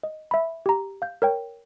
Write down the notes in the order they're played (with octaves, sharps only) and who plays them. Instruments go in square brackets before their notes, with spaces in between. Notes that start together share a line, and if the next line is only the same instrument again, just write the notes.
[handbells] D#5
E5 B5
G4 A#5
F5 G6
A#4 C#5 G5